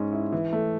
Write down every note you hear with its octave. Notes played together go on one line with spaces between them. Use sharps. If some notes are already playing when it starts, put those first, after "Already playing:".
Already playing: G#2 G#3 C#4
E4
E3
A3